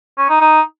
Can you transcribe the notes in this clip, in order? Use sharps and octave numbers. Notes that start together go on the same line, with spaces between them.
C#4
D#4
D#4